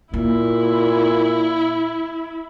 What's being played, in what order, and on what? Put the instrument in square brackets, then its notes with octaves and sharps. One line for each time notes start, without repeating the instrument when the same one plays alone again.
[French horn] A#2 [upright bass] A#3 [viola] E4